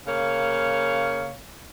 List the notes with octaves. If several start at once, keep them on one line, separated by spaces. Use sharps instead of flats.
C#3 A#3 C#5 F5